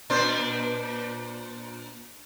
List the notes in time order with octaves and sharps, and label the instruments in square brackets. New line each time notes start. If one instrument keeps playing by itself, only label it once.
[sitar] A#2 D4 C5